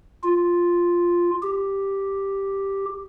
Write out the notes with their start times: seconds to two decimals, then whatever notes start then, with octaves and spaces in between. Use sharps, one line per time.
0.23 F4
1.42 G4